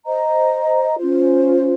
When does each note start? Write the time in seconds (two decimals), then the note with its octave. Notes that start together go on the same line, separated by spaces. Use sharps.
0.06 C5 D#5 A#5
0.97 C#4 F4 C5